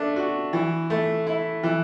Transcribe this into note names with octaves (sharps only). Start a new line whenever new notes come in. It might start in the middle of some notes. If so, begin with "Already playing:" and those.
Already playing: A3 D4
F#4
E3
A3
E4
E3